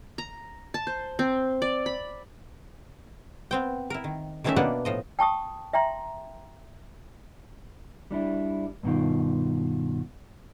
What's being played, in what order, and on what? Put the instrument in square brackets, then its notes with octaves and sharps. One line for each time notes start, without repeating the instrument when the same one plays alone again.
[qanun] A#5
A5
C5
C4
D5
B5
[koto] B3 C4 G5
E4 A#4
D#3
D#3 E3 A3 C#4 D#4 E5
B2 A#3 B3 D4 B4 F#5
A2 F3 D#5
[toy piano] G5 A5 C#6 D#6
E5 G5 A#5 C6
[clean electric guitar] G3 D4 E4
G2 B2 D#3 F4